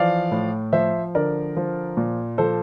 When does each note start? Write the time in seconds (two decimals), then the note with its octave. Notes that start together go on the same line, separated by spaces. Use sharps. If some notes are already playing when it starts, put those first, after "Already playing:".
Already playing: E3 F3 D5 F5
0.31 A2
0.73 F3 C5 E5
1.14 D3 A#4 D5
1.56 F3
1.97 A#2
2.38 F3 A4 C5